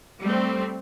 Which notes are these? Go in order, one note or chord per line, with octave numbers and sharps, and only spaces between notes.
G3 A3 C4